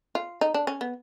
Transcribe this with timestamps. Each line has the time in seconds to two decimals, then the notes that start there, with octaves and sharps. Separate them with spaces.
0.15 F4
0.41 D#4
0.54 D4
0.67 C#4
0.81 B3